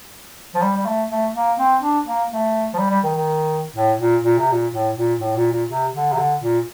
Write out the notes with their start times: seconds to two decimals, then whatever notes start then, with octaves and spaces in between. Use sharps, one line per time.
0.55 F3
0.62 G3
0.76 G3
0.86 A3
1.10 A3
1.35 A#3
1.59 C4
1.82 D4
2.06 A#3
2.31 A3
2.74 F3
2.78 G3
2.90 G3
3.04 D#3
3.15 D#3
3.75 A2
4.00 A#2
4.24 A#2
4.38 C3
4.52 A#2
4.72 A2
4.97 A#2
5.20 A2
5.37 A#2
5.53 A#2
5.69 C3
5.93 D3
6.12 C3
6.18 D3
6.42 A#2